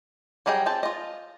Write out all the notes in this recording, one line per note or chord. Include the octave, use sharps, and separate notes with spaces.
F#3 G3 G#4 D#5 G5
C4 G5 A5
F4 D#5